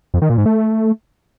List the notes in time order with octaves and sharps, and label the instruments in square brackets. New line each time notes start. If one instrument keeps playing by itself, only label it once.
[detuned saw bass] F2
D#3
A#2
G#2
A3